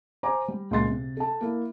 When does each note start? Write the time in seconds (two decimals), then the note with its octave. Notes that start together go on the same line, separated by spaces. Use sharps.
0.23 C5 G#5 A#5 D6
0.48 G3
0.71 C#2 A#2 C6 A6
0.89 C3
1.17 A4 A5
1.41 A#3 E4